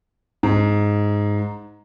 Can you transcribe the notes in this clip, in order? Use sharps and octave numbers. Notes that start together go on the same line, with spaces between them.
G#2